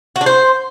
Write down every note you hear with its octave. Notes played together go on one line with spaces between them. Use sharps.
F#4
D4
C5